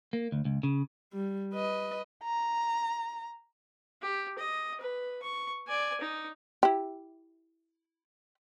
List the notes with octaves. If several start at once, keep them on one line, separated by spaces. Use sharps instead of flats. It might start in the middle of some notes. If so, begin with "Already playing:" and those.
A#3
D2
C#2
C#3
G3
B4 D#5
A#5
G4
D#5
B4
C#6
D5 G#5
D#4
E4 G4